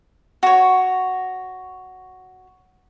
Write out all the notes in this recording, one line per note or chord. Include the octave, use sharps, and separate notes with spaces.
F#4 C#5